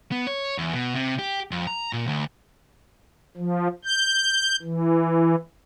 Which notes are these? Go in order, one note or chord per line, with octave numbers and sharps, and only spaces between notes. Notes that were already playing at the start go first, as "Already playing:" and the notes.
B3
C#5
E2
B2
C3
G4
F2
A#5
A#2
D2
F3
G6
E3